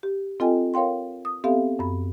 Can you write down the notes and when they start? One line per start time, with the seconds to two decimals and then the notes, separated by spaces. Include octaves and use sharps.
0.03 G4
0.40 C4 F4 A4 D#5 G5 G#5
0.74 A#4 C#5 F5 G5 C6
1.25 D#6
1.44 B3 C4 G4 A4 E5 F5
1.79 F#2 B5